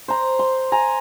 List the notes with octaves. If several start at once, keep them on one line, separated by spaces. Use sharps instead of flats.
C5 A#5
C6
G#5 A#5